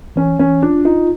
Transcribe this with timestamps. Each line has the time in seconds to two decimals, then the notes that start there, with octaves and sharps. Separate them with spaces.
0.16 E3 C#4
0.39 E3 C#4
0.62 D4 F4
0.85 D#4 F4